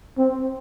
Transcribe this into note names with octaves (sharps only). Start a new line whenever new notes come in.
C4